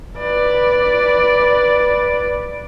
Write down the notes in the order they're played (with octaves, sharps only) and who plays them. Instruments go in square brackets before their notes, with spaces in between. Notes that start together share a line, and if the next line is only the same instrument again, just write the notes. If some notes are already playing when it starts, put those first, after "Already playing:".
[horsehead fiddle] B4 D5